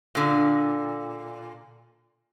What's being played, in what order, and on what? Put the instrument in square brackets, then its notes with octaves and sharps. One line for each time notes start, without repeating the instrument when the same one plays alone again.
[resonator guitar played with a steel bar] A#2 D3